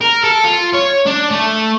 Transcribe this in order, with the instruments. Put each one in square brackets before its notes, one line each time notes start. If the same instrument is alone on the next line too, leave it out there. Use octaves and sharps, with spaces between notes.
[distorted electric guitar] A#4
A4
F4
C#5
D4
A3